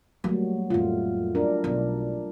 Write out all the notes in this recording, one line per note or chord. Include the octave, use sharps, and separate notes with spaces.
F#3 G3 A3 A#3
A1 F2 A3 F4
D4 A#4
B1